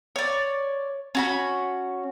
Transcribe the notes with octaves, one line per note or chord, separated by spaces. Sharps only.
C#5 D5
C#4 F#4 B5